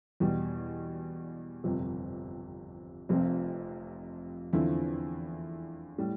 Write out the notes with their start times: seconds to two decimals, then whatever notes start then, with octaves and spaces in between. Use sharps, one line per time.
0.20 E2 B2 G3
1.64 G1 F2 C3
3.09 F1 F2 C3 F3 C4
4.53 E2 D3 F3 C4 E4
5.98 A2 G3